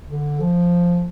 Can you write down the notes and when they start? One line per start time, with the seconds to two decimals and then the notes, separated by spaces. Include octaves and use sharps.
0.07 D3
0.40 F3